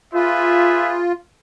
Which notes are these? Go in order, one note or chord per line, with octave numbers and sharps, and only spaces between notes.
F4 G#4 B4 E5